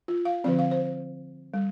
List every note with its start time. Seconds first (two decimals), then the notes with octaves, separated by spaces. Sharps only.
0.08 F4
0.25 F5
0.44 D3 F3 C4 D5
0.59 F5
0.71 C5
1.54 G3